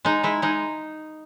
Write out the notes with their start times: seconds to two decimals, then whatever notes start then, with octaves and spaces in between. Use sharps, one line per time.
0.05 G#3 D#4
0.23 G#3 E4
0.42 G#3 D#4